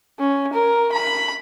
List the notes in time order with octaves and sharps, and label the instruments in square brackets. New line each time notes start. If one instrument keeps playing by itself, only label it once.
[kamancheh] C#4
A#4
B5